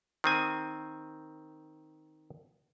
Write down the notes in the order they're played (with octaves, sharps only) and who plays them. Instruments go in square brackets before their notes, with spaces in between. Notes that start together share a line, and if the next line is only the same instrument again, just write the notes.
[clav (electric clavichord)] D#3 C4 G#5